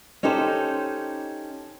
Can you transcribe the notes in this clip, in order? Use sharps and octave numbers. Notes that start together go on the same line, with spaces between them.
C#4 D#4 G4 A4 C5